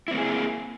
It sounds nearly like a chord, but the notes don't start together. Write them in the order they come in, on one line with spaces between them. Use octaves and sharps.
E4 C4 A#3 G#4